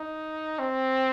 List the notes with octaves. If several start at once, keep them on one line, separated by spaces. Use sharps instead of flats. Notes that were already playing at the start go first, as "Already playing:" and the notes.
Already playing: D#4
C4